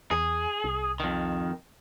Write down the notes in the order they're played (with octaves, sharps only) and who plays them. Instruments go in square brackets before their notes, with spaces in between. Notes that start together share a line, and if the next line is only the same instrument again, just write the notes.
[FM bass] E2 [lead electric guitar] G#4
[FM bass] C2
[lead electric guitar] F2 D#3